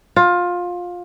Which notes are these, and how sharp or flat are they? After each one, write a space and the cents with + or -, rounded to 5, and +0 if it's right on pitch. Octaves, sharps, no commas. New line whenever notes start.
F4 +20